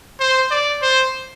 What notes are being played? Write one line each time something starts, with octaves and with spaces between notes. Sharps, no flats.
C5
D5
C5